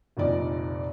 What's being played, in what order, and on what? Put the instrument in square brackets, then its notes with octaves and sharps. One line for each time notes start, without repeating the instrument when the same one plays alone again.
[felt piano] F1 A#1 A#2 D#3 D5 D#5